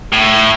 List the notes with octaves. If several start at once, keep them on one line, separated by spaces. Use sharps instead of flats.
A2